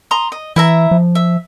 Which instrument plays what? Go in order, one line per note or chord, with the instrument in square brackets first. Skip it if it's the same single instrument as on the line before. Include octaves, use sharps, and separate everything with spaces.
[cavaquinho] A#5 C6 D#6
D#5
[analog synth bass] E3 [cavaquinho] E4 E5 A#5
[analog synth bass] F3
[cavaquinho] E5